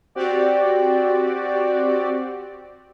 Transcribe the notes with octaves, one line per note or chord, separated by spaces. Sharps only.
C4 F#4 G4 D5